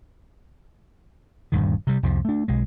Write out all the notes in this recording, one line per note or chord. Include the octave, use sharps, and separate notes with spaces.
D#1 D2 G2 D#3
C3 G3
C2 F2 F3
A3 D4
B1 G#3